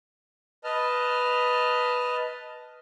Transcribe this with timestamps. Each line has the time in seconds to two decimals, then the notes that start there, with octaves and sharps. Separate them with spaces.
0.64 B4 D#5 A5 F6